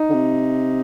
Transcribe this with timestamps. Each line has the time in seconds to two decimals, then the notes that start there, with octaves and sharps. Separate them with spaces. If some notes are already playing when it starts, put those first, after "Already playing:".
Already playing: D#4
0.09 D3
0.14 C3